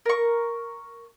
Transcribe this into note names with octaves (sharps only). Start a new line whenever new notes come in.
A#4 C#6